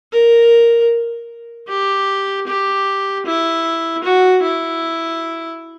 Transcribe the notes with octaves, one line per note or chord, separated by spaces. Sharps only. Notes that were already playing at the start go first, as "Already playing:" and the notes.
A#4
G4
G4
E4
F#4
E4